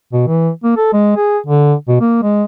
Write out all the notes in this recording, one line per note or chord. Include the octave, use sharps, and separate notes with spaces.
B2
E3
A#3
A4
G#3
G#4
D3
B2
A#3
G#3